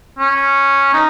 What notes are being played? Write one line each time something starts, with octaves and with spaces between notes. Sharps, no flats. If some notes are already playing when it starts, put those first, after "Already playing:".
C#4
D#4